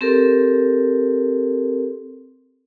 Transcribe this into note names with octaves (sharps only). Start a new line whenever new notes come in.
C4 G4 A4 A#4